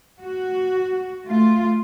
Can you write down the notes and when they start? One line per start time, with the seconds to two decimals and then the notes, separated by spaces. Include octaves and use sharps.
0.21 F#4
1.25 A3 F4